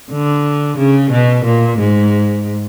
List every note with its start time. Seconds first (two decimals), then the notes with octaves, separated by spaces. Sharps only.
0.11 D3
0.78 C#3
1.12 B2
1.45 A#2
1.79 G#2